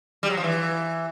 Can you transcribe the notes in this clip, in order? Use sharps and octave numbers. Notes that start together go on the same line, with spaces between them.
G3
F#3
F3
E3